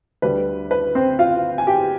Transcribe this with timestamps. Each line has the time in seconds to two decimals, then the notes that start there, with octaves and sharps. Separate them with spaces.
0.22 D2 D3 G3 B4
0.71 B4
0.95 C4 C5
1.19 F4 F5
1.58 G#5
1.67 G4 G5